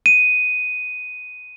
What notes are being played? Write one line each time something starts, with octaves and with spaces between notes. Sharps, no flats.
D#7